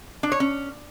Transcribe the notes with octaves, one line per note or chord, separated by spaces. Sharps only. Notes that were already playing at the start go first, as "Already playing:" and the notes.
D4
C#5
C#4